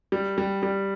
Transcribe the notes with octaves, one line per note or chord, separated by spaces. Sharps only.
G3
G3
G3